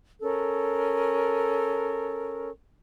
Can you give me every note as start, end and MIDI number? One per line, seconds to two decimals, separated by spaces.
0.22 2.49 61
0.22 2.49 69
0.22 2.49 70